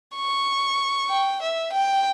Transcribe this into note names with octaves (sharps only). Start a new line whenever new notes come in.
C#6
G5
E5
G5